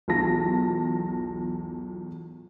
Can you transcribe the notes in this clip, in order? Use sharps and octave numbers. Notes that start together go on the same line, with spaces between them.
B1 E2 F4 A5 A#6